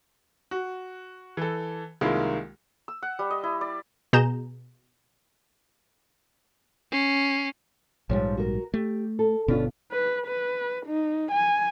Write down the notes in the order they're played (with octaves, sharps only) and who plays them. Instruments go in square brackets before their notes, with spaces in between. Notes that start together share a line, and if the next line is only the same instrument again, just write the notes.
[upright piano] F#4
E3 A4
C2 D#3 G#3 A#3 E4 F4
[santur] E6
F#5
G3
D#5
E4
D5
[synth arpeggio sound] B2 G#4 A#5 G6 E7
[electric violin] C#4 C7
[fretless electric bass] A#1 G#2 G3 [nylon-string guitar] F3 C#5
[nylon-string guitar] F#4 A#4
[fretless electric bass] A3 [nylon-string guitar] G4
[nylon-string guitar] A4
[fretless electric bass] G1 B2 B3 [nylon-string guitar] C#4 D4 F4
[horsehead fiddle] B4
B4
D#4
G#5